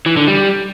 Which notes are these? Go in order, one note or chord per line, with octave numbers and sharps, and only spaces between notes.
E3
D3
G3